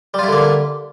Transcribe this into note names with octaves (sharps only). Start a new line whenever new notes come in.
D3 G3 A#3 E4 F4